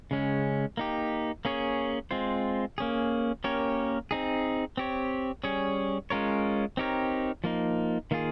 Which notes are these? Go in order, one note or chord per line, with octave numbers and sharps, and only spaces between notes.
C#3 G#3 C#4
A#3 D#4 G4
A#3 C#4 G#4 C#5
G#3 C4 F4 C5
A#3 C#4 G#4
A#3 C#4 G4 A#4 C#5
C4 D#4 G#4
C4 G4 C#5
G3 C#4 G#4 C#5
G#3 C#4 F4 A#4 C#5
C4 D#4 G4 A#4 C#5
F3 A#3 D#4
D#3 A#3 F4 G#4